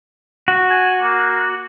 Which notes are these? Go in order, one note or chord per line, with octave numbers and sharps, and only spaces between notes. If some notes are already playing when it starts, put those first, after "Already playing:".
F#4
G#5
A#3